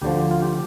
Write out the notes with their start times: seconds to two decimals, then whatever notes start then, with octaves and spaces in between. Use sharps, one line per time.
0.02 D2 D3 F3 G4
0.31 F4
0.42 G4